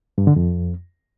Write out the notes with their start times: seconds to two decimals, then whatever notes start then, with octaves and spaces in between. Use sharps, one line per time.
0.18 G2
0.27 D3
0.36 F2